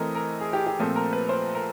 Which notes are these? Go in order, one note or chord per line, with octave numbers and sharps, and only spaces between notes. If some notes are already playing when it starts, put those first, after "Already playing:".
Already playing: E3 A3 C4 A#4 D#5
A#4
G#4
G4
G4
A#2 F3 A3 C4
A#4
B4
C5
A#4